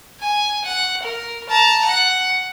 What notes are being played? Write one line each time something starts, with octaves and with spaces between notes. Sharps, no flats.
G#5
F#5
A#4
A5 A#5
F#5